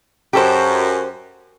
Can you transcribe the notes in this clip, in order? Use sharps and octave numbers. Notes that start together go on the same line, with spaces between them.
F#2 G4 A4 C5